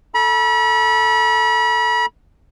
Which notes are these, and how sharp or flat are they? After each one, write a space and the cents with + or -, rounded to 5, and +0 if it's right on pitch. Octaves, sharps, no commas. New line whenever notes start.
A4 +0 B5 -40